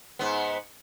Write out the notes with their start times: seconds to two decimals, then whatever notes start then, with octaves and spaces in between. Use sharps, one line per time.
0.19 G#2 B3